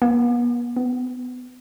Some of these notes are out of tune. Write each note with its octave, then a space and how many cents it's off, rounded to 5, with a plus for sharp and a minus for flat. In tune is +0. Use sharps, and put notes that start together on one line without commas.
B3 -45
B3 +20